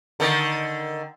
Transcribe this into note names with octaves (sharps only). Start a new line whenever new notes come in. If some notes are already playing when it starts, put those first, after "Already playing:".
D3 D#3